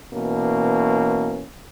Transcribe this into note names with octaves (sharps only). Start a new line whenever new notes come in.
B2 E3 A#3 C#4